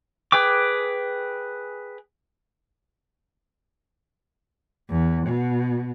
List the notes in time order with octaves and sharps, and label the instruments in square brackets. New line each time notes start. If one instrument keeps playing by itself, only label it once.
[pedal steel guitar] G#4 B4 G5 D6
[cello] E2
B2